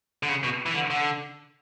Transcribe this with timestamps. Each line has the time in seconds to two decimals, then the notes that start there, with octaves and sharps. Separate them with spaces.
0.23 D3
0.29 C#3
0.43 B2
0.66 E3
0.74 D3
0.90 D3